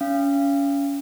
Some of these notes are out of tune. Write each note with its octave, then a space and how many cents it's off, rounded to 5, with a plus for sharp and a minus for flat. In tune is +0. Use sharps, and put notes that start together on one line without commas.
C#4 +25 F5 -25